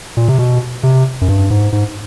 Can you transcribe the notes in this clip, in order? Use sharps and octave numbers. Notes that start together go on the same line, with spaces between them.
A#2
C3
B2
C3
F#2
G2
G#2
G#2